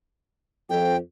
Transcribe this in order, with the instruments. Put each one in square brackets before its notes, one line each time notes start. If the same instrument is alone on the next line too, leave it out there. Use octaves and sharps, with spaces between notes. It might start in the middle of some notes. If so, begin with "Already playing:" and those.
[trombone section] F2 [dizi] G5